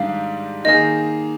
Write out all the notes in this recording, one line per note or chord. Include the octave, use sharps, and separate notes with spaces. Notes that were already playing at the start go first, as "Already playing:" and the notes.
Already playing: G#2 D#3 G3 D4 G4 F5
D#3 A#3 D#4 G#4 D#5